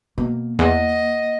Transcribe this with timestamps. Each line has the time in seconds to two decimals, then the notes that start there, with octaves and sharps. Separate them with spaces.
0.18 B2 A#3
0.59 E2 D#5 F#5